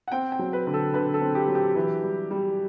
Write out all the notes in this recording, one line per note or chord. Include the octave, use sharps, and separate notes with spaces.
F#5
C4 G5
G5
F#3
B4
D3
A4
D3 B4
A4
C4
G4
F#3
G4
E3
G3
G3